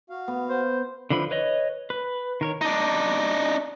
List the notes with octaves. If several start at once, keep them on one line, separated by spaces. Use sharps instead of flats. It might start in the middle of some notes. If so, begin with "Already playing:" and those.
F#4 F5
B3
C5
D3 E3 F3 B5
B4 C#5 D#5
B4
D#3 A#4 C#5
D4 D#4